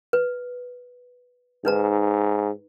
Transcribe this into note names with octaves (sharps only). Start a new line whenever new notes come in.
B4
G#2 D#4 B4 A#5